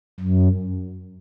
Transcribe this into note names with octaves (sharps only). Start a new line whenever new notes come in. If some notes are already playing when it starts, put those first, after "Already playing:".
F#2